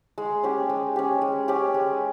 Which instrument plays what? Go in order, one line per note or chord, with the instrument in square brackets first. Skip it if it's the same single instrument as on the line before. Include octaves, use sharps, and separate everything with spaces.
[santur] G#3
C#4 G4
G#3
C#4 G4
G#3
C#4 G4
G#3